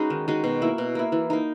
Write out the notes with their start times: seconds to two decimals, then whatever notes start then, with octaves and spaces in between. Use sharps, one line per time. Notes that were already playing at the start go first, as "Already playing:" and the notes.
Already playing: G#3 C#4 D#4 F#4 B4
0.10 D#3
0.28 G#3 D#4 F#4
0.44 B2
0.62 A#3 E4
0.78 B2
0.95 A#3 E4
1.12 E3
1.30 A#3 D#4